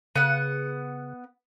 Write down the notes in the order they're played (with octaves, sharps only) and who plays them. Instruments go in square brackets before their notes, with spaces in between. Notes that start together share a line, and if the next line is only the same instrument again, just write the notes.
[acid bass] C#3 [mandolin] B3 F#5